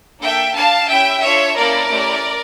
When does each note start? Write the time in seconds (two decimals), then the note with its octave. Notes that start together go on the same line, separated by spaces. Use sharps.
0.21 A#3 D4 A4 E5 G5
0.55 D4 G4 F5 A5
0.89 C#4 E4 G4 E5 G5
1.22 D4 F4 A4 C#5 E5
1.56 A#3 C#4 E4 A4 A#4 D5
1.89 A3 C#4 E4 G4